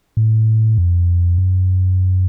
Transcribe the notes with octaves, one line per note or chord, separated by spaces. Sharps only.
A2
F2
F#2